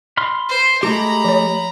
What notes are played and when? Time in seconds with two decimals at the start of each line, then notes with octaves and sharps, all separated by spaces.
0.17 B5 C6 F6
0.49 C5
0.83 G#3 A3 G4 A#5 B5
1.25 F3 C#5